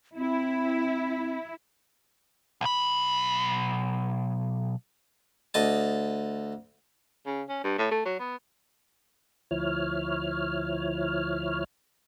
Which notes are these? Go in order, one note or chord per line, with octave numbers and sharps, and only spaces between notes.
C4 E4
B1 B5
D2 D#5 A5
C#3
C#4
G2
A2
A3
F#3
B3
D2 F3 E4 C#5 F6